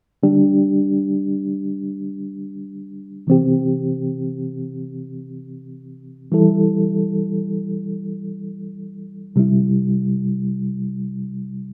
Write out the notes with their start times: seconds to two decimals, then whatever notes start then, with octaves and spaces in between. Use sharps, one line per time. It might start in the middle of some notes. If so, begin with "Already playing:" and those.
0.23 D3 G3 D4 G4
3.27 C3 E3 C4 G4
6.32 E3 G3 E4 A4
9.36 C3 G3 E4